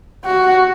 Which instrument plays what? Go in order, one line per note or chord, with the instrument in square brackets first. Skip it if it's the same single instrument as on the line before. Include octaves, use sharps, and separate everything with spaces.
[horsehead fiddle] F#4